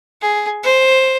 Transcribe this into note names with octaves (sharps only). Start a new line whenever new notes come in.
G#4
C5